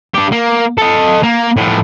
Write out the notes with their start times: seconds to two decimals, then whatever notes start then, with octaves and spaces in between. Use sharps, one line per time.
0.14 D4 G4
0.32 A#3
0.78 A4 D#5
1.23 A#3
1.56 A2 F3